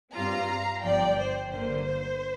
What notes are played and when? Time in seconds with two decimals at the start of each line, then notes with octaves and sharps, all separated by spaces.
0.14 G2 G3 C4 F4 F5 A#5
0.82 G1 G2 F3 D5 G5
1.17 C5
1.51 G1 G2 D3 A#3 C5